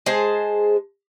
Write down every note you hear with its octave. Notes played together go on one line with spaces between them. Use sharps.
G#3 G#4 C5 A5